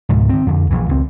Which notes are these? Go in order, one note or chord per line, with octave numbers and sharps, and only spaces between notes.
C#2 G#2 B2
D#3 C4
F2 D3
A#1 E3
C#2 C4